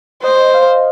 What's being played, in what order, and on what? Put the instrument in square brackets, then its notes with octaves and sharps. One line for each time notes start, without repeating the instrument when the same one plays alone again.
[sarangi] C5 [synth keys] D#5
[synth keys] F5